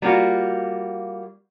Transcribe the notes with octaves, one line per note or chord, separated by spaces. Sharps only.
G3 A#3 F4 F#4